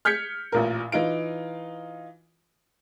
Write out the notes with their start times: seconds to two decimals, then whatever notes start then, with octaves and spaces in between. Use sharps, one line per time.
0.05 F6 G6 G#6 B6 C#7
0.52 A1 A#2 A#4
0.92 E3 D#4 F4 D7